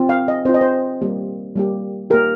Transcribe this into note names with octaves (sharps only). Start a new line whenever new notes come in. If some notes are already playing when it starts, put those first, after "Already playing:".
Already playing: C4 F4
F5
D#5
C4 F4 C5
D#5
C5
G3 A#3 G4
G3 A#3 G4
A#3 G4 A#4